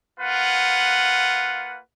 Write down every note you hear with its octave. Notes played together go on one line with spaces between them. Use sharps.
A#3 F4 B4 F#5